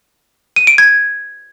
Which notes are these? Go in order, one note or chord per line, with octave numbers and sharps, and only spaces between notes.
D#7
D7
G#6